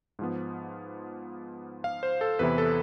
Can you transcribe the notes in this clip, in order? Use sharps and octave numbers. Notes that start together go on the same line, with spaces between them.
G#2 F3 B3
F5
C5
A4
E2 C3 E3 B3 E4 B4
A4